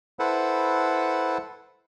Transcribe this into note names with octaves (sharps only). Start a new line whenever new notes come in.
E4 A4 B4 C5 F#5